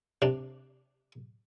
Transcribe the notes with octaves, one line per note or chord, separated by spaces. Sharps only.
C3 D4